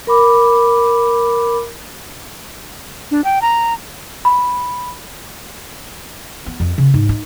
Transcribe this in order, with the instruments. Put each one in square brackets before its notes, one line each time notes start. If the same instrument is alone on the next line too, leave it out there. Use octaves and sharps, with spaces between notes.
[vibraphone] A#4 B5 D6
[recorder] D4
G5
A#5
[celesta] B5
[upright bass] B3
F2
C#3
G#2
D#4